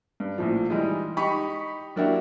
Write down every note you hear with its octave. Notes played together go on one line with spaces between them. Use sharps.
G2
A#1 A2 F3
E3 G3 G#3 D#4
D#4 G4 B5 C#6
F#3 A#3 D4 E4 F#4 G4